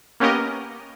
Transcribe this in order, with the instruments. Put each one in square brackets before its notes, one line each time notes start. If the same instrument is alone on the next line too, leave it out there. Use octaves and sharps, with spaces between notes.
[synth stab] A#3 B3 C#4 G4 A#4 D#5